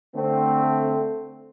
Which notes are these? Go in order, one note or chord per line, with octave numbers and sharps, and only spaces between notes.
D3 A3 C4